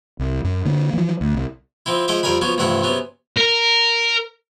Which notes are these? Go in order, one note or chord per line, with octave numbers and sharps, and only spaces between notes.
C2
F#2
D3 A#3
E3 F3
D2
C2
F3 C4 E4
F3 G#3 D#5 E5 D6
F2 G3 A#4 D5 G#5 B5
F3 F#3 B3 C#4 F#4
A1 G2 C3 F3 E4 F#5
C3 F#3 B3 C#4
A#4